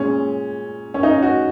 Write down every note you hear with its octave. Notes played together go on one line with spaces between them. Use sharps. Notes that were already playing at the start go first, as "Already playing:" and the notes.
Already playing: A#2 G#3 C#4
C#4
D#4
F#4